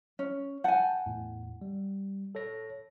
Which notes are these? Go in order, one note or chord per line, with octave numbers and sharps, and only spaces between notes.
C#4
F#5 G#5 A5 G6
E2 A2
G3
A4 C#5 A#6